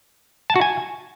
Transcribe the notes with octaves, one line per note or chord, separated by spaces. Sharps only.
A5
F#4
G#5